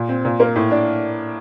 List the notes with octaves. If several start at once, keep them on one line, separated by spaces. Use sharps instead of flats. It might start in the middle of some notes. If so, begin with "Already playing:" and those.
Already playing: A#2
C4
A#2
A#3
A2
D4